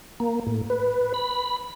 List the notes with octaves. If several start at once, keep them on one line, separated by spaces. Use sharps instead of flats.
A#3
A2
B4
B5